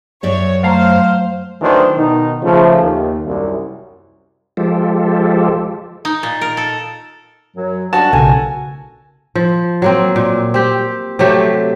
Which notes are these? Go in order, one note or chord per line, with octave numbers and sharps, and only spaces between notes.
F#2 C#5 D5 E5
F#3 A3 C5 F5 A#5
D2 D#3 E3 F#3 D4 C5
B2 D#3 D#4
C#3 F3 A3
D#2
C2 F#2
F3 G#3 F4 G4 A4
D#4
A#2
A#4
A4
F#2 F#3
G2 C#4 D4 F#4 A5
B1 C#3 A4 A#4 G#5
F3
F#3 A#3 C4
A#2
C4 G4
C3 F#3 A3 G4